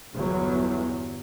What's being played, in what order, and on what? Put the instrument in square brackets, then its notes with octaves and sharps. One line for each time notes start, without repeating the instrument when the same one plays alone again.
[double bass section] G1 E2 F#3